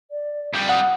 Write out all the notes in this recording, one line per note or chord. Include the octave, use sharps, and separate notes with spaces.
D5
F2 G3
F#5 D#6